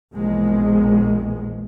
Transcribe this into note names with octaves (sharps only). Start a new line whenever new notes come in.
A#1 E2 B2 G#3